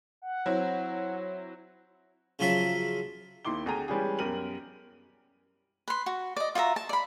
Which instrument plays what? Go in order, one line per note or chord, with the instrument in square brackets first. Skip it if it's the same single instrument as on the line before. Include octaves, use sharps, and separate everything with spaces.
[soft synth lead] F#5
[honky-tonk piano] F#3 C4 E4
[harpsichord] C#3 F3 F#3 F4 E5
[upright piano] D#2 D#3 E4 C6 D6 G7
D2 G#4 G5 A#5 D#7
E3 G3 G#3 C#4 G4 G#4
B1 F#2 G4 A#4 D#7 F#7
[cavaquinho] B4 C6
F#4
D5 D#5
F4 F#4 E5 A#5
A5
D5 B5